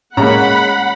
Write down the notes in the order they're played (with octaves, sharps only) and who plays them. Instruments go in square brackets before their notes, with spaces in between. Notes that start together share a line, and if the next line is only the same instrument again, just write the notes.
[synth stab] A2 A#3 [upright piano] G#3 A#5 [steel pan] C#4 [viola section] F#5 B5